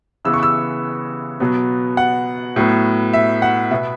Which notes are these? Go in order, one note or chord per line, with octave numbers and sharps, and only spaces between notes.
C#3 E3 B3 E6
C#6
E6
B2 F#3 B3
F#5
A2 F#3 B3
E5
F#5
B2 B3 E5